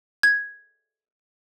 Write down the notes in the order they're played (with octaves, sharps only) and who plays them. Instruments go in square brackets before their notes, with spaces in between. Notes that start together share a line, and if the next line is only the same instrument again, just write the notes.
[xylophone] G#6